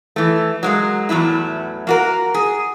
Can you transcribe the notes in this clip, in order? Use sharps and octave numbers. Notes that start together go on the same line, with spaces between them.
E3 A3
F#3 G#3 A#3
E2 A2 F#3 E4
A#3 F#4 A#4
G#4